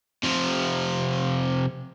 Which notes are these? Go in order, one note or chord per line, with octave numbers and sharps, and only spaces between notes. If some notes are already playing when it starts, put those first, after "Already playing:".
C3 F3